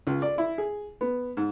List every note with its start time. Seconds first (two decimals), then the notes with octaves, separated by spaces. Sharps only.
0.07 C#2
0.22 D5
0.38 E4
0.58 G#4
1.01 B3
1.37 G#2